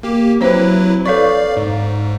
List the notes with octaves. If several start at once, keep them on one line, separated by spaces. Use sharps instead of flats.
A#3 G4
F#3 C4 E4 B4 C5
A4 C#5 D5 F5 C#6
G#2